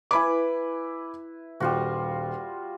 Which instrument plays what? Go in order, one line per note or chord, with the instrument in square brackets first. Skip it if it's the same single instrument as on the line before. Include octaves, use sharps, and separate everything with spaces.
[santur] E4 B4 [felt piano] G#5 B5 D6
[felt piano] D#1 [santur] G3 F4 F#4